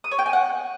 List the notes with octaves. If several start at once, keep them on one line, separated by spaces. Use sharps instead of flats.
D#6
C#5
G5
G#5
F#5